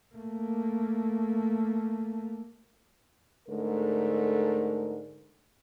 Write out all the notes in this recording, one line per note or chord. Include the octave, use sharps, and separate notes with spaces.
A3 A#3
G#2 D3 A3 A#4